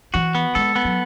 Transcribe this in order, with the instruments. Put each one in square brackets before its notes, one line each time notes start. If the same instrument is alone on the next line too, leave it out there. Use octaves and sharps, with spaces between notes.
[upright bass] E3 [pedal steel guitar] F#4
[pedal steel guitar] B3
[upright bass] G#3 [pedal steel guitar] A4
[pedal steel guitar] B3
[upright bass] F#3